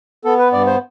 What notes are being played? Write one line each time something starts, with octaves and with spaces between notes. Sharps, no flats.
B3 A4
B4
G2 D5
C5